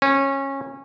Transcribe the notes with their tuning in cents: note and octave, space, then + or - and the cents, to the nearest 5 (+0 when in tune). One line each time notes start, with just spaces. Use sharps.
C#4 -20